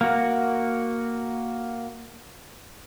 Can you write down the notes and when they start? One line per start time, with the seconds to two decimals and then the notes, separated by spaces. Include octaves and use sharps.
0.01 A#3 F#4